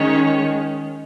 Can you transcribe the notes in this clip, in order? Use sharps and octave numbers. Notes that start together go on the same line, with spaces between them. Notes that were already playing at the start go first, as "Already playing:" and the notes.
Already playing: D#3 G#3 C#4 C#5